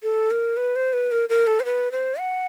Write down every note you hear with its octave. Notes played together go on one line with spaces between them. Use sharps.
A4
A#4
B4
C5
B4
A#4
A#4
A4
C5
B4
C5
F#5